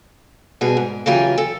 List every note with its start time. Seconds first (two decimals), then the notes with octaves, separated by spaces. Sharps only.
0.61 B2 G3 F#4 G#4
0.77 G#2
1.06 C#3 E3 F#3 F4 G4 G#5
1.38 A4